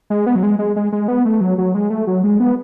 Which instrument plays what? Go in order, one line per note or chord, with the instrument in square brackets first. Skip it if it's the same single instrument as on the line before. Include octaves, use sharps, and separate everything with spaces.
[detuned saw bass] G#3
B3
F#3
G#3
G#3
G#3
G#3
B3
A3
F#3
F#3
G#3
A3
F#3
G#3
B3